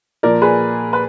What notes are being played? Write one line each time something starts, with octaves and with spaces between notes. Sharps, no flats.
A#2 F3 A#4 D5
G#4 B4
B4